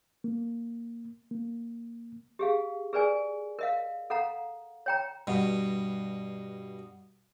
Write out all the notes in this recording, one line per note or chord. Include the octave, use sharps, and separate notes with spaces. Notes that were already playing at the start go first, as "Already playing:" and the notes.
A#3
A#3
G4 G#4 F5
G#4 A#4 B4 D5 G#5
A#4 D#5 F5
A4 F5 F#5 A#5
C#5 G5 A#5
G2 B2